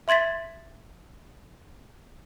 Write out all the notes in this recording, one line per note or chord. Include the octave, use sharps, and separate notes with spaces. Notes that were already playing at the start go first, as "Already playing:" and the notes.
E5 C6 G#6 A6 B6